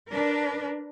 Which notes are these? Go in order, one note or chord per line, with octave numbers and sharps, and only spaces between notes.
D4 A#4 B4